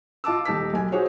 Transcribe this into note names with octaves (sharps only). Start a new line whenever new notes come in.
F4 D#5 A5 D6 E6
D#1 D#4 A5 E6 B6
B1 G#5
D#4 F#4 G#4 C5 C#5